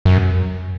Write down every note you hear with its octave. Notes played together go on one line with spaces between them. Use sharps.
F#2